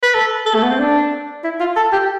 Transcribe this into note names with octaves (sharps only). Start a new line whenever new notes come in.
B4
A4
A4
A3
B3
C4
D4
E4
F4
A4
G4